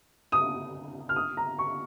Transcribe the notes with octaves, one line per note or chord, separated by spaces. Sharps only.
D#6
F6
D#6
A#5
C#6